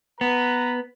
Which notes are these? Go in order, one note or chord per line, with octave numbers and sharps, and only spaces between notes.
B3 B4 A#5